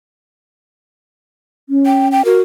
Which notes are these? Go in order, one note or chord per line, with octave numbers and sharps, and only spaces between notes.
C#4
G5
G5
F#4 A#4